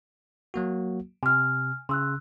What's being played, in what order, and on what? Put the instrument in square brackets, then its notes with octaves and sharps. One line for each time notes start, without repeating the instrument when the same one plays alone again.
[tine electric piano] F#3 A#3 F#4
[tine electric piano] C3 [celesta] G#5 F6
[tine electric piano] C#3 [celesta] C6 E6 F#6